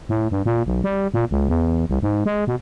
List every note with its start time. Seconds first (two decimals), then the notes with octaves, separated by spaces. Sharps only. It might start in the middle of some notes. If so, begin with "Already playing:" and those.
0.09 A2
0.31 G2
0.46 A#2
0.66 B1
0.84 G3
1.14 A#2
1.31 C#2
1.49 E2
1.89 C2
2.03 G#2
2.26 G#3
2.47 B2